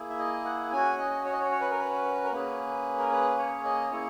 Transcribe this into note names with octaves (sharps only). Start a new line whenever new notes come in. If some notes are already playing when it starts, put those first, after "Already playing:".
Already playing: A#3 E4 G#4
E5
D#5
F#5
C#4 F#4 G#5
D#5
C#5
D#5
C#5
C#5
B4
A#4
B4
A#4
A#3 C#4 G#4 B4
A#4
B4
C#5
D#5
A#3 E4 G#4 C#5